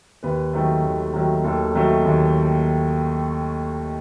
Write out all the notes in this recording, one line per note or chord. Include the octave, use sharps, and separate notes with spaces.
D#2 B4
D#3 F#3 A3
D#2
D#3 F#3 A3
D#2 A4
D#3 F#3 A3
D#2